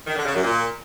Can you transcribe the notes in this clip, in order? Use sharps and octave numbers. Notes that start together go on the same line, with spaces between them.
D#3
D3
C#3
F#2
A#2